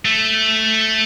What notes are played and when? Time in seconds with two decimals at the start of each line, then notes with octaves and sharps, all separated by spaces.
0.05 A3